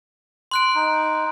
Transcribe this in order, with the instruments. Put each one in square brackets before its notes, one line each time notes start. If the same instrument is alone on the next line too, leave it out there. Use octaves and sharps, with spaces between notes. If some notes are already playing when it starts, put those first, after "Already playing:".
[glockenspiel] C6 F#6 D7
[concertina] D#4